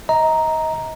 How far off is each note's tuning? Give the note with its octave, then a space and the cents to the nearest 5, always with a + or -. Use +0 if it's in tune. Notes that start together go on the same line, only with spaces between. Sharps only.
D#5 +30 A#5 +0